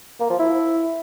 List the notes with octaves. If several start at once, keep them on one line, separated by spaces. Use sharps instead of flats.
A#3
F3
E4